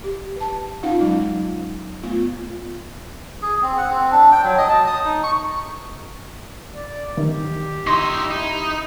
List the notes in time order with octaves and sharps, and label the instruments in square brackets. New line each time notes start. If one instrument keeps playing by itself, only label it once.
[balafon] G4
B4 A5
C#4 D#4 F4 F5 F#5
F#3 G#3 D#4
A3 B3 F4
[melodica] G#4
C4
F#5
C4
D4
G5
F#3
D#5
A5
D#6
D#4
C#6
[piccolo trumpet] D5
[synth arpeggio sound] D#3 [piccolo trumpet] G4
[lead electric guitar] D#4 E4 [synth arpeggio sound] C6 A#6
[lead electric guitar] D#4 [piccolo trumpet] E4